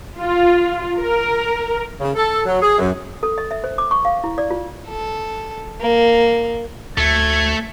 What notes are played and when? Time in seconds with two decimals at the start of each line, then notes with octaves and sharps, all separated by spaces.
0.19 F4
0.98 A#4
2.01 C#3
2.15 A4
2.46 F#3
2.61 G#4
2.79 F#2
3.23 A4
3.38 D#5
3.51 E5
3.64 C5
3.78 D6
3.91 C#6
4.05 F5
4.24 E4
4.38 D5
4.51 F4
4.88 A4
5.81 A#3
6.98 D2 A3 G#6